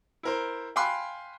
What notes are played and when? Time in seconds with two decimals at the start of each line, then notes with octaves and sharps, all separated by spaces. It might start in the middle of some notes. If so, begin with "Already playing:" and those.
0.23 E4 A#4 C5
0.76 F5 G5 G#5 B5 C6 F#6